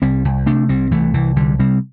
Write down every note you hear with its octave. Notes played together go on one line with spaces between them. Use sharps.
C2 G3 C4
C2
C3 A3 D4
C2 G3 C4
C2 E3 A3
C2 E3
C2 D3 G3
C3 G3 C4